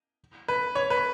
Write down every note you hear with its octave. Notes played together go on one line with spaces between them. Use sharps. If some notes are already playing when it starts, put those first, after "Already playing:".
B4
C#5
B4